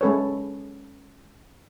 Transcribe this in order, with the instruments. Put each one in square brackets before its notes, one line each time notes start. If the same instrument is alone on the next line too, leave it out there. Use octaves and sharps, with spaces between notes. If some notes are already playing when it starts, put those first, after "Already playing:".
[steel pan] G#3 C#4 A4 B4 C#5